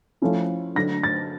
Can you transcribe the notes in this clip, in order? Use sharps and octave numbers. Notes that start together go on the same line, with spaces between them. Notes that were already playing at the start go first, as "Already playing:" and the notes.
F3 A3 C#4 E4
D3 F#3 A3 A#6
A6